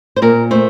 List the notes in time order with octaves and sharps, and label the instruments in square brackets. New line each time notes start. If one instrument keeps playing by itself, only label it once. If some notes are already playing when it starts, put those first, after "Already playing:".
[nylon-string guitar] C5
A#2 A#4
A3 C5